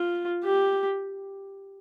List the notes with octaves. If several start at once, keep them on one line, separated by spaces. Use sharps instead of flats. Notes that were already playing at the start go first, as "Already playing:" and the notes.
Already playing: F4
G4